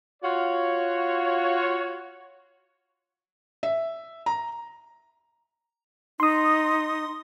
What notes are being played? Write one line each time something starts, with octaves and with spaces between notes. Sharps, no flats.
F4 F#4 C#5
E5
A#5
D#4 C6 D#6